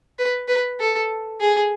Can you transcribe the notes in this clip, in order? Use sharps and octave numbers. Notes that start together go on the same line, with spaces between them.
B4
B4
A4
G#4